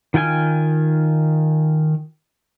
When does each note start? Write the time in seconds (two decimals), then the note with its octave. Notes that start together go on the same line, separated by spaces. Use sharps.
0.14 D#3 F4 G5 G#5 F6